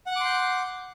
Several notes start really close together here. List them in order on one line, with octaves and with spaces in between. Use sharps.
F#5 F#6 D6 C6 G6